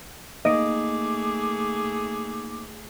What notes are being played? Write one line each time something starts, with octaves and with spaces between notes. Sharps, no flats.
A3 A#3 D#4 G#4 D#5 D6 D7